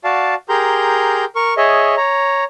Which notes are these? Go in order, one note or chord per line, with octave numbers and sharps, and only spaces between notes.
F#4 D5 F5 A5
G4 G#4 A#4 A#5 C6 G6
A#4 C#6
G#4 C#5 D#5 E5
C#5 A#5